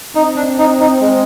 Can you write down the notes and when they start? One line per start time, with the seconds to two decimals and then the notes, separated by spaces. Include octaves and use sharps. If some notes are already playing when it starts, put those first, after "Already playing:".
0.15 C4 D#4
0.36 D4
0.58 D#4
0.80 D#4
1.01 G#3